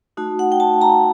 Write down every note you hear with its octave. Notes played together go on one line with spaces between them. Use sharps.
A3 D#4 F#4
F#5
G5
A5
A#5